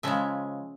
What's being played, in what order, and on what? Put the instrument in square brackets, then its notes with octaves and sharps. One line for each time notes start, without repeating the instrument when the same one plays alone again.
[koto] C#3 F3 G#3 E5